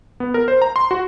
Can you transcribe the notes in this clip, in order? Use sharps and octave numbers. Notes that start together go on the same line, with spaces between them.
B3
A#4
C5
A#5
C6
F#4